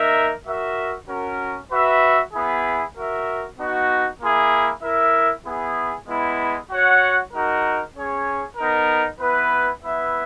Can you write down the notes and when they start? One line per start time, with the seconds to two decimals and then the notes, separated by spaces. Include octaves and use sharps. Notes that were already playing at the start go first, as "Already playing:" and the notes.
Already playing: A#3 D#4 A#4 E5
0.46 F#4 A#4 E5
1.08 C#4 F#4 A#4
1.71 F#4 B4 E5
2.33 B3 E4 G#4
2.96 F#4 A#4 E5
3.58 B3 D#4 F#4
4.20 A#3 E4 G#4
4.82 E4 A#4 E5
5.44 B3 E4 G#4
6.07 G#3 B3 E4
6.69 F#4 C#5 F#5
7.33 G#3 D#4 F#4 A#4
7.95 C#4 G#4 C#5
8.57 B3 D#4 A#4
9.20 B3 E4 B4
9.83 B3 E4 B4 E5